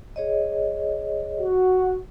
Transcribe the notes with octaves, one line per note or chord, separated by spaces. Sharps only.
G#4 C#5 D#5
F#4